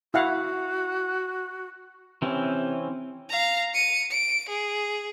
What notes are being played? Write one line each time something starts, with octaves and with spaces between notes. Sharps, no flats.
E4 F#4 F5 F#5
C3 E3 C4 C#4
F5 A#5
C#7 D#7
D7
G#4